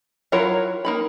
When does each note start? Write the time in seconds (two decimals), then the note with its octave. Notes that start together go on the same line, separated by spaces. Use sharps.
0.32 F#3 E4 F4 A#4 C#5
0.85 A#3 D#4 B5